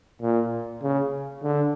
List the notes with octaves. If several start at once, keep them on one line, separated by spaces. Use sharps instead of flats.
A#2
C#3
D3